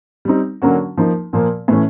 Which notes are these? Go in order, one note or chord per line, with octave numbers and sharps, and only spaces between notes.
G3 C4 D#4
D3 F#3 A#3 C#4 F#4
F3 A#3 D#4
A#2 F3 A#3
A2 E3 A3 C#4